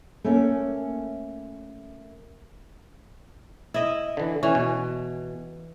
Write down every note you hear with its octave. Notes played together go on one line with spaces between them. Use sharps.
A3 A#3 C#4
E4 D#5
D3 E3
E3 C#4
B2